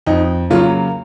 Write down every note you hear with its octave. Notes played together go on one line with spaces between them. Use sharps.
F2 D#4
C#3 F#3 A#3 F4